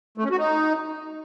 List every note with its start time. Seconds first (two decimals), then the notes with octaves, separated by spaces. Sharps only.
0.18 A3
0.24 C#4
0.31 F#4
0.38 D#4